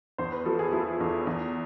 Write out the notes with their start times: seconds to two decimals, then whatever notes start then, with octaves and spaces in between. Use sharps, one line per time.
0.18 E2 C5
0.32 B4
0.45 F3 A4
0.59 G#4
0.73 F3 E4
1.00 E2
1.27 E2